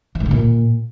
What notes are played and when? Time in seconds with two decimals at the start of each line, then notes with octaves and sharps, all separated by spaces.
0.15 E3
0.20 G#2
0.26 D3
0.31 A#2